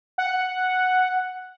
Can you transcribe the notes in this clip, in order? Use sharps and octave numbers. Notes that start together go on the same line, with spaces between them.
F#5